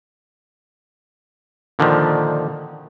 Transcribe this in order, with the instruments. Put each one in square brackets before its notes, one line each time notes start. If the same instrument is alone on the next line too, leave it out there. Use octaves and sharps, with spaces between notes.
[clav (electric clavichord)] A#2 D3 D#3 F3